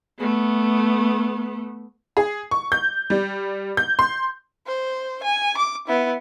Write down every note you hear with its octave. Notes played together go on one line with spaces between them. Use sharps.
A3 B3
G#4
C#6
G6
G3
G6
C6
C5
G#5
D6
B3 E4